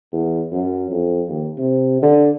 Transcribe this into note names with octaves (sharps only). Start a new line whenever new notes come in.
E2
F#2
F2
D#2
C3
D3